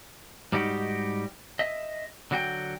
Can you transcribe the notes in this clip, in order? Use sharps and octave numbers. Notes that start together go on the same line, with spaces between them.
G#2 G3 D#4 F#4 G4
D#5 E5
D3 F#3 F#4 B4 G5